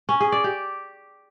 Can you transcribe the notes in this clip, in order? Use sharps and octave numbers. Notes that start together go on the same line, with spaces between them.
C#4
G#4
D5
G4